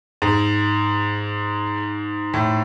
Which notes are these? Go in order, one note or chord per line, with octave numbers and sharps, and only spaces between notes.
G#2
A2